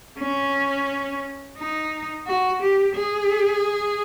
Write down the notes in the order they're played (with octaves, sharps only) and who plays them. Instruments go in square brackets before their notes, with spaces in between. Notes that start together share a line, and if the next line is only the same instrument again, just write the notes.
[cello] C#4
D#4
F#4
G4
G#4